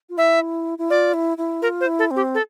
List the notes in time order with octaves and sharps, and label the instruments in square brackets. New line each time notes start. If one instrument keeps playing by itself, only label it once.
[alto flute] F4
[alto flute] E4 [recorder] E5
[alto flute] E4
[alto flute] F4 [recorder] D5
[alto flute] E4
E4
[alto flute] F4 [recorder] A#4
[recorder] C5
[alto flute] E4
[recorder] A4
[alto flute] C4
[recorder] G4
A4